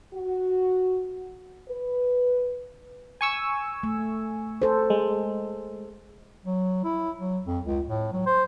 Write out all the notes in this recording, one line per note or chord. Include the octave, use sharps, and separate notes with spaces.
F#4
B4
G#5 C#6 E6
A3
A4 C5
G#3
F#3
E4
F#3
F2
C#2
A2
F#3
C5